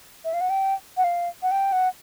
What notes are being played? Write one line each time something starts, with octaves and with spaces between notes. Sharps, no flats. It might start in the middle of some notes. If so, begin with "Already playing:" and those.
E5
F5
F#5
G5
F#5
F5
F#5
G5
F#5